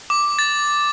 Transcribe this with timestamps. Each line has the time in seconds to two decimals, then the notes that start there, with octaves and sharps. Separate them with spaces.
0.10 D6
0.39 A6